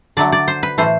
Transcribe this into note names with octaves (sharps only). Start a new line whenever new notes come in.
D3 F#3 A3 D5
D5
C5
B4
A2 E3 A3 C5